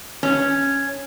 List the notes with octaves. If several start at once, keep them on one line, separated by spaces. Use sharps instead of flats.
C#4